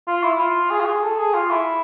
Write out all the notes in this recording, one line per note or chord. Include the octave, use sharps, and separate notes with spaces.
F4
E4
F4
G#4
F4
G#4
A4
G#4
F4
E4